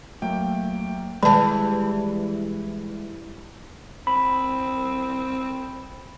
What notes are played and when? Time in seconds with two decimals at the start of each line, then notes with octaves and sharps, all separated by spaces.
0.22 F#3 A3 A#3 G5
1.23 D#3 E3 G3 G#3 A5
4.07 C4 B5